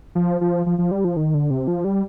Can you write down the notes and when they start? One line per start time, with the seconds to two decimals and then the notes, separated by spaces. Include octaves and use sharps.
0.15 F3
0.41 F3
0.66 F3
0.78 F3
0.91 G3
1.04 F3
1.17 D#3
1.34 D3
1.50 C3
1.68 F3
1.84 G3